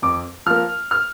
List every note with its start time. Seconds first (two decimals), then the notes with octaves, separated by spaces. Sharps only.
0.02 F2 D6
0.46 F3 A#3 F6
0.91 F6